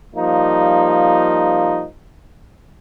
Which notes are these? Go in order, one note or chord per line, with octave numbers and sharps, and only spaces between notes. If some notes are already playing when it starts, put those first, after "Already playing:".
F3 G3 A#3 D#4